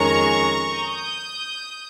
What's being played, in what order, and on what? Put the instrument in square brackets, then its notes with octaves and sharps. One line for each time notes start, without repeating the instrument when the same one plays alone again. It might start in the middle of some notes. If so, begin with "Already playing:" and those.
Already playing: [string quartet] F2 D#3 G#3 C#4 [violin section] A#5 C#6
[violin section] D#6 G6